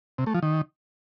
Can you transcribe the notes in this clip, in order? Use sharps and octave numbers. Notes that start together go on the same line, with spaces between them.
C3
A3
F3
D#3